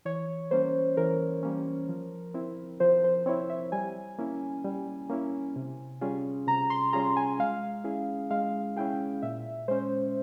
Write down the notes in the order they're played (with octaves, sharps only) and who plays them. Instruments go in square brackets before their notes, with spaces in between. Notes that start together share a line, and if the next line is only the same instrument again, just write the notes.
[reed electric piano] E3 [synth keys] C#5
[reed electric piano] G3 A#3 C#4 [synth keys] C5
[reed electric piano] E3 [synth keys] A#4
[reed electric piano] G3 A#3 C#4
F3
C4 E4
[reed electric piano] F3 [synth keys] C5
[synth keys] C5
[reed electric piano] C4 E4 [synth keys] C#5
[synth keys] E5
[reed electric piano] G3 [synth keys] G#5
[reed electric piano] A#3 C#4 E4
G3
A#3 C#4 E4
C3
G3 C#4 F4 G#4
[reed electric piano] C3 [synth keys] A#5
[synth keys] C6
[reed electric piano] G3 C#4 F4 G#4 [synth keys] A#5
[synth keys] G#5
[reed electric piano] G#3 [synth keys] F5
[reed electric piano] C#4 E4 G#4
[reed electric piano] G#3 [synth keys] F5
[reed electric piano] C#4 E4 G#4 [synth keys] G5
[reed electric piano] A#2 [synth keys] E5
[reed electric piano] G#3 C#4 [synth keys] C5